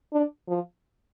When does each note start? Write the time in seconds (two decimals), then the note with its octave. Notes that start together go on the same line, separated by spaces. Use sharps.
0.12 D4
0.48 F3